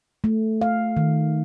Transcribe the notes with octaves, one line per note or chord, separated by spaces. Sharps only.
A3
F5
D#3